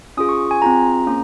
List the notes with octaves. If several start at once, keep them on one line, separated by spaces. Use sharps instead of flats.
C#4 F4 G#4 D#6
C#6
G#5
C4 F4 G#4 A#5
A#3 C#4 G#4